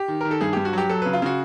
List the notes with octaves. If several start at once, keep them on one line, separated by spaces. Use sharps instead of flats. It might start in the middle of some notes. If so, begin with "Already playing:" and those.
Already playing: G4
D#3
D#3 A#4
A4
G2 G#4
G2 G4
F#4
F#3 G4
F#3 A4
C#3 B4
F4
C#3 F#4